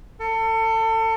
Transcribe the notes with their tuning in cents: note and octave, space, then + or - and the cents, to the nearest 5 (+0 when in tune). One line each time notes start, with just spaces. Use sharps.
A4 +30